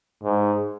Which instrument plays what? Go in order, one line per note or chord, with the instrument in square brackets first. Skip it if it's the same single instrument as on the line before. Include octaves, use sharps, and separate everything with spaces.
[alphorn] G#2